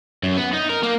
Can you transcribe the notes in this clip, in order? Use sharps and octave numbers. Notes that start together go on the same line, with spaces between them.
F#2
B3
D#4
A#4
A#3